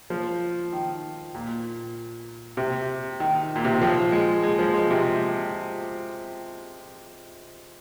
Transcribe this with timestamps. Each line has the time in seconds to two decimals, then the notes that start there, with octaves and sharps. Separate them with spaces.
0.10 F3
0.73 D#3
1.35 A#2
2.57 C3
3.20 D#3
3.56 A#2
3.65 C3
3.73 D#3
3.81 F3
4.12 G#3
4.43 G#3
4.59 F3
4.74 G#3
4.90 C3